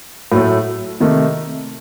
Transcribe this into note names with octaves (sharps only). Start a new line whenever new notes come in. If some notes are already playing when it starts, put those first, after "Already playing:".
A2 F#3 A3
C3 D#3 A3